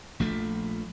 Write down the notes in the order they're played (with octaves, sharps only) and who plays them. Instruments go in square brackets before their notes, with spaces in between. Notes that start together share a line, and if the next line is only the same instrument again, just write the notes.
[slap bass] A#1 F3 A3